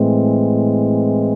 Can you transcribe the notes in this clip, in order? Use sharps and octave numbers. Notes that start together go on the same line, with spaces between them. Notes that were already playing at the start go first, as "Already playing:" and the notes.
Already playing: A2 E3 G#3 C4